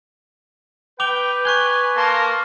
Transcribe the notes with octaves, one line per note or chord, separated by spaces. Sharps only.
B4 G5 D6 F7 G7
G#5 C#6 F#6 G7
A#3 A#4 A5 C6